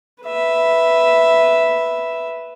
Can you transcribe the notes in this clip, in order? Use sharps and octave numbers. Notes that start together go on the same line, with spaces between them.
B4 E5